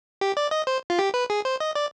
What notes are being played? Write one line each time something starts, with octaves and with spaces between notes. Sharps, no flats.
G4
D5
D#5
C5
F4
G4
B4
G#4
C5
D#5
D5